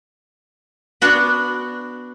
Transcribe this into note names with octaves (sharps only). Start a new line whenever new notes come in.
B3 D4 F#4 B4